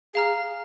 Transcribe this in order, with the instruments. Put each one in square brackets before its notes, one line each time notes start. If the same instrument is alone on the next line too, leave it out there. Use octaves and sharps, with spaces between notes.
[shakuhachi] G#4 [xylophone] F5 A#5 F6